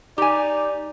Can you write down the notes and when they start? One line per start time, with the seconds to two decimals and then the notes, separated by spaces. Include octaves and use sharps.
0.18 D#4 G4 D5 G#5